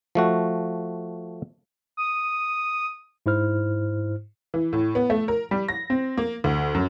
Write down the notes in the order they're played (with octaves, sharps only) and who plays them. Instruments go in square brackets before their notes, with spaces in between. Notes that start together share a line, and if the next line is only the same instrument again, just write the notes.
[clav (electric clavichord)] F3 A3 F#4
[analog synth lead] D#6
[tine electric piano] G#2 E4 C5 F6
[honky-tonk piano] E3
A2
B3
A3
A#4
G3
A#6
C4
A#3
D2
F#2